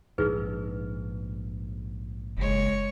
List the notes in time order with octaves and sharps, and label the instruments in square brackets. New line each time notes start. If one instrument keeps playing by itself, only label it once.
[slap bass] A#1 G#2 [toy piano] D#4 G#4 B4
[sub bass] F#1 [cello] G#3 C#5